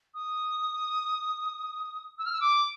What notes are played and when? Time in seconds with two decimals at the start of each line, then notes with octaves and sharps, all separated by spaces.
0.14 D#6
2.18 E6
2.25 F6
2.33 E6
2.40 D6